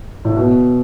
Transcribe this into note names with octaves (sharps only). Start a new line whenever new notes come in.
A2
B2